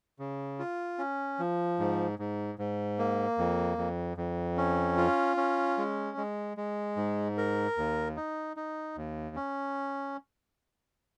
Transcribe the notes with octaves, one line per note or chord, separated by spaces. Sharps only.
C#3
F4
C#4
F3
G#2
G#2
G#2
A#3
F2
F2
F2
C#4
F4
C#4
G#3
G#3
G#3
G#2
A#4
D#2
D#4
D#4
D#2
C#4